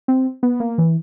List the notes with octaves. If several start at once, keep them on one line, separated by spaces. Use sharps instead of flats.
C4
B3
A#3
E3